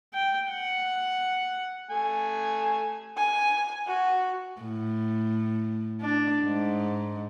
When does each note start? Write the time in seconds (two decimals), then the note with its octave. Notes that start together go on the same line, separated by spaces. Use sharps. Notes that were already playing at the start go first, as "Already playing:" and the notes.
0.14 G5
0.51 F#5
1.90 A3 G#5
3.17 G#5
3.87 F#4
4.62 A2
6.01 D4
6.44 G#2